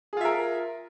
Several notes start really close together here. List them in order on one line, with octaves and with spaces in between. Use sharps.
G#4 F4 E5 A#4